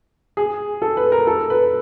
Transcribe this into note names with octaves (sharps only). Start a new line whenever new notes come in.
G#4
A4
B4
A#4
A4
B4